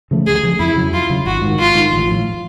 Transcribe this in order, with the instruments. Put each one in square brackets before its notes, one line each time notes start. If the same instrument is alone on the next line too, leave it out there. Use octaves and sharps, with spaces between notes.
[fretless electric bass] C#3 F3 A3
[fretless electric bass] D2 [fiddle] G#4
[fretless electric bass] C#3 F3 A3
[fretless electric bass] F2 [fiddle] E4
[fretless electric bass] C#3 F#3
[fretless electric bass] F2 [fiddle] F4
[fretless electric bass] C#3 F#3
[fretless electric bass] G#1 [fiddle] F#4
[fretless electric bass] G#2 D#3
[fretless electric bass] G#1 [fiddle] F4
[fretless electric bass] G#2 D#3
A1
A2 F3